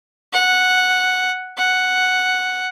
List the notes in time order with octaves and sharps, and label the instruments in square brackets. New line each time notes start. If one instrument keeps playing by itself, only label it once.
[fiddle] F#5
F#5